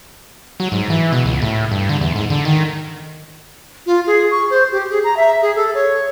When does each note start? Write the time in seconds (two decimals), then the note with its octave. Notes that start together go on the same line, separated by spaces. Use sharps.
0.60 F#3
0.72 G#2
0.90 E3
1.12 B2
1.25 C#2
1.42 A2
1.71 G2
1.89 D3
2.01 E2
2.15 G#2
2.30 D3
2.45 D#3
3.86 F4
4.07 G#4
4.31 C#6
4.50 C5
4.72 G4
4.91 G#4
5.04 A#5
5.17 E5
5.42 G#4
5.56 A4
5.75 C#5